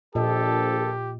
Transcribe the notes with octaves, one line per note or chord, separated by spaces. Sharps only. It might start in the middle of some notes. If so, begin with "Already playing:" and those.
A#1 A#2 G4 A4 D#5